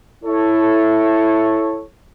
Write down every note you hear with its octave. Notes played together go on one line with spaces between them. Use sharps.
E4 A4 C#5